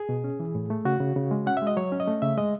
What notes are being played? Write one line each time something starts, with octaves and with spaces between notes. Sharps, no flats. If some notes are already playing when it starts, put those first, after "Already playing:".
Already playing: G#4
B2
C#4
E3
A2
A3
C#3 F#4
C#3
C#3
G#3
C#4 F#5
G#3 E5
D#5
F#3 C#5
C#4
D#5
A3
C#3 E5
G#3 D#5